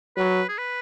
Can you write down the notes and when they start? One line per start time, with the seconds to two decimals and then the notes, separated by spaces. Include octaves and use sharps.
0.17 F#3 B4
0.49 G#4
0.58 B4